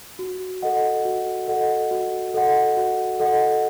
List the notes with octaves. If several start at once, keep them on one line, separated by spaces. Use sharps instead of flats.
F#4
A4 D#5 F#5
F#4
A4 D#5 F#5
F#4
A4 D#5 F#5
F#4
A4 D#5 F#5